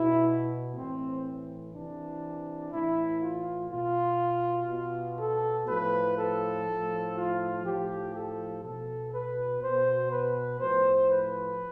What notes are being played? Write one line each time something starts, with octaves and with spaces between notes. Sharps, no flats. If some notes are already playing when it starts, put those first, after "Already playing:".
Already playing: B2 E4
A2 E3 C4
C3 E3 D4
A2 E3 E4
F4
B2 F4
B2
A4
A2 F3 B4
A4
A2 F3
F4
A2 F3 G4
A4
B2 A4
B4
B2 C5
B4
A2 F3 C5
B4